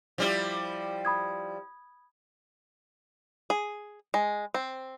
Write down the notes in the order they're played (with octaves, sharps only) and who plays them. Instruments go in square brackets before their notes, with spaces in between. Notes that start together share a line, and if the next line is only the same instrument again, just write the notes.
[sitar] F3 G3 E4
[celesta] B5 D#6 G#6
[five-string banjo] G#4
G#3
C4